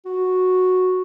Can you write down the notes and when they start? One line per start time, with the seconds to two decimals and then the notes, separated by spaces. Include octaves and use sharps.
0.06 F#4